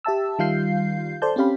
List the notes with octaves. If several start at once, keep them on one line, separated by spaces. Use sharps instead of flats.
G4 E5 A5 E6
D#3 G3 F4 F5 G6 C7
A4 C5 D5 A5 G6
C4 C#4 G4 F5 B5